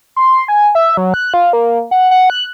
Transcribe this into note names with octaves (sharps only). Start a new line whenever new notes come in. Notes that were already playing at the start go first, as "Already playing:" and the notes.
C6
G#5
E5
F#3
F#6
F4
A#3
F#5
F#5
F#6